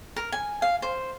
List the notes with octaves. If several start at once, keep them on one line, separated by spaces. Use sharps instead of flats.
A#4
G#5
F5
C5